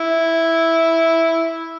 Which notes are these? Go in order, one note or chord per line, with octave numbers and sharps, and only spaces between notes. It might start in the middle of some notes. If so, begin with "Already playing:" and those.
Already playing: E4